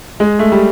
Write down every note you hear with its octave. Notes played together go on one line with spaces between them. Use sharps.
G#3
A3
G3